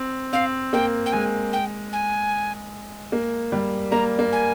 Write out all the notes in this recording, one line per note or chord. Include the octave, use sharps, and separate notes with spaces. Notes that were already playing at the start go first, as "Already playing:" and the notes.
Already playing: C4
C4 F5
A#3 G5
G5
G#3 G#5
G5
G#5
A#3
G3
A#3 A#5
A#3
G#5